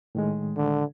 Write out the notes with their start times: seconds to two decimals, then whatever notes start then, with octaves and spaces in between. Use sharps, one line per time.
0.15 A2 D#3 G#3
0.57 D3